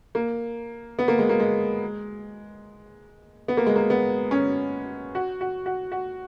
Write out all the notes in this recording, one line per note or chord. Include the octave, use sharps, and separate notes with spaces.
A#3
B3
A#3
G#3
A#3
G#3
B3
A#3
G#3
A#3
B3
C#4
F#4
F#4
F#4
F#4